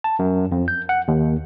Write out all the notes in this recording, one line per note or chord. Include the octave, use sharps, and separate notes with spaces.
A5
F#2
F2
G6
F#5
D#2